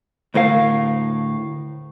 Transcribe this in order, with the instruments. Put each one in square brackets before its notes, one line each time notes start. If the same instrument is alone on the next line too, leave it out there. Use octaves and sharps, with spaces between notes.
[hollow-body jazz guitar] D2 A2 A#4 F5